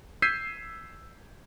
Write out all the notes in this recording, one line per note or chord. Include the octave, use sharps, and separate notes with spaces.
E6 G6 G#6 B6 C7 D#7